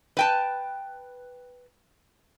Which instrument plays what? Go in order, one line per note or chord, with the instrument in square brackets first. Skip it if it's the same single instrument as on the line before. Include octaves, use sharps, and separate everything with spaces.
[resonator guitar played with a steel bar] B4 G5 A5